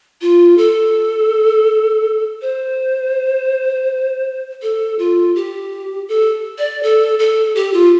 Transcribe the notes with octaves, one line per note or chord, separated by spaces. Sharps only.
F4
A4
C5
A4
F4
G4
A4
D5
A4
A4
G4
F4